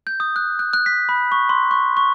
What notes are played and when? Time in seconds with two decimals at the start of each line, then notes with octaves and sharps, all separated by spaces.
0.07 G6
0.20 D#6
0.36 F#6
0.59 F#6
0.73 F#6
0.86 B6
1.09 B5
1.32 C#6
1.49 C6
1.71 C#6
1.97 C#6